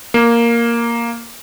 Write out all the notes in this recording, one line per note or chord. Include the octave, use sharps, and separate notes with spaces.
A#3